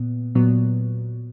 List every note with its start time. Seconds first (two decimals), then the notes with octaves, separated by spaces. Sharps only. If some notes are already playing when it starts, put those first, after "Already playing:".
Already playing: A#2 B3
0.35 A#2 F#3 B3